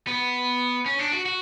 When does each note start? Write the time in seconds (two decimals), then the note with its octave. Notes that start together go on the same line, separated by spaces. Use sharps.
0.07 B3
0.86 C#4
0.99 D4
1.13 F#4
1.26 F#4